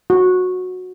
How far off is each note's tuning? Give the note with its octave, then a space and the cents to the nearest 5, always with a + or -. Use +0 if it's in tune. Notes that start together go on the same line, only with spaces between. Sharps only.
F#4 -15